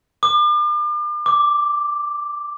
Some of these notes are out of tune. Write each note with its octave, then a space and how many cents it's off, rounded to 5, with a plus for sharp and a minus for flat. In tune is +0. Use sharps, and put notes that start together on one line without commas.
D6 +40
D6 +0